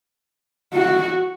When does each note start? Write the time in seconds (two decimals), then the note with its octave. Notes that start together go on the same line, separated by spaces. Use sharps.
0.74 F#4